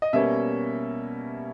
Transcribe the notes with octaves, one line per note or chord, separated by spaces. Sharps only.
D#5
B2 G3 A#3 C#4 E5